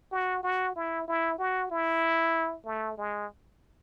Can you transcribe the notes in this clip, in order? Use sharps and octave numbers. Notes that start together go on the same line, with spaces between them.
F#4
F#4
E4
E4
F#4
E4
A3
G#3